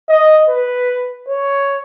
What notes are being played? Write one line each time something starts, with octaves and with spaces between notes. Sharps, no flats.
D#5
B4
C#5